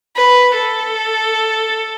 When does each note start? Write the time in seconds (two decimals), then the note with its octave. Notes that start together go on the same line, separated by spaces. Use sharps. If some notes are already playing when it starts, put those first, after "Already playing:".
0.17 B4
0.55 A4